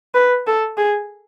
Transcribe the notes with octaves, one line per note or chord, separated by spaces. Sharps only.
B4
A4
G#4